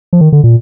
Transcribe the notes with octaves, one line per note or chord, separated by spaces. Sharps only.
F3
D#3
D3
A#2